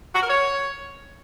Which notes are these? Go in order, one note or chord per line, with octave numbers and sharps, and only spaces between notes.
F#4
A#4
C#5